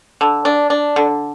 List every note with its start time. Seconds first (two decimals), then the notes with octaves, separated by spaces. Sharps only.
0.21 D3
0.45 D4
0.70 D4
0.96 D3